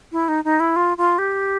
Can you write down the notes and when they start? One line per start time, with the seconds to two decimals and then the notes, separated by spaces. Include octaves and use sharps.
0.12 E4
0.28 D#4
0.44 D#4
0.60 E4
0.76 F4
0.97 F4
1.18 G4